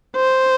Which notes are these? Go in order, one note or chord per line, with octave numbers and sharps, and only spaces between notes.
C5